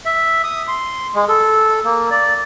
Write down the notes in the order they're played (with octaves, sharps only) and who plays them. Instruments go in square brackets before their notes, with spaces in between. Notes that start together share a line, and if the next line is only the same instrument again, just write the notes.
[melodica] E5
D#6
C6
G#3
A4
A#3
D5